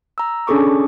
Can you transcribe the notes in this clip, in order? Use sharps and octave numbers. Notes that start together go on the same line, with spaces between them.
A#5 E6
C#4 D4 G#4 A4 C#6 D6